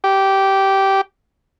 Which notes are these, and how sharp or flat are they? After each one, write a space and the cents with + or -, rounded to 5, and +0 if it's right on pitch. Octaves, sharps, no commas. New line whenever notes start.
G4 -15